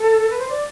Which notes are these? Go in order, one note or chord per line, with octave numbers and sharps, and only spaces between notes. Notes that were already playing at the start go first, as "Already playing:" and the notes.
Already playing: A4
B4
C5
D5